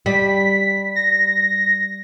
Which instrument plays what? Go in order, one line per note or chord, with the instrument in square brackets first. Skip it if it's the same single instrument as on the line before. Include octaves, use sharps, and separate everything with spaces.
[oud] G3 [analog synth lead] B6
[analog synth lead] A#6